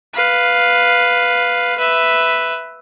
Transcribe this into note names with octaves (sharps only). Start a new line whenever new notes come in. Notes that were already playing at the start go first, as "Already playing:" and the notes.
B4 F5
B4 E5